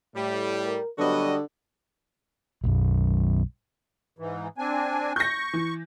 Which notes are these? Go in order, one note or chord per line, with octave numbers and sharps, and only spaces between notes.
A2 G3 A3
A#4
D3 F#3 G3 B3 F#4 D#5
B1 F#2
G#2 E3
C4 D4 G#5
C#6 G6 A#6
E3